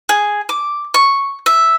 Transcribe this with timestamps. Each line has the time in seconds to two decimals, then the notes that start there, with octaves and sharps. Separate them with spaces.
0.09 G#4
0.49 D6
0.94 C#6
1.46 E5